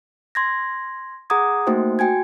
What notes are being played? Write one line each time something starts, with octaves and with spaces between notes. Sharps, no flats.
C6 G#6 A#6
G#4 F#5 A#5 D6 D#6 G#6
A3 A#3 D#4 F#4 C5 G5
F#4 G5 G#5 G#6